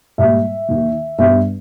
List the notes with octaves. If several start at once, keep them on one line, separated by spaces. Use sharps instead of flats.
G#2 G3 A#3 E5
D#2 D#3 A#3
G2 G3 B3 E5